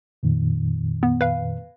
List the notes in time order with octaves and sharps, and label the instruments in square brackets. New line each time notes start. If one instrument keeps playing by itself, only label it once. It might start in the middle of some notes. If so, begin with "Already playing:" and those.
[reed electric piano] F2 A#2 D#3
[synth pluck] B3
B4 F5